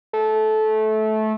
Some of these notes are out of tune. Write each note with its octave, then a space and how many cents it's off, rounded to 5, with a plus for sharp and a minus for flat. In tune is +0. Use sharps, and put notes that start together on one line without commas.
A3 -20